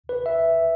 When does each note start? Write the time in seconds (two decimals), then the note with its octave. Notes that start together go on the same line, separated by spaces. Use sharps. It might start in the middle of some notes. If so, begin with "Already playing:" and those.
0.09 B4
0.26 E5